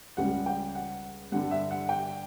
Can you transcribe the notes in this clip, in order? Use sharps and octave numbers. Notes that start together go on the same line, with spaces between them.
C#2 C#3 G3 F#5
G5
F#5
G2 D3 G3 F#5
E5
F#5
G5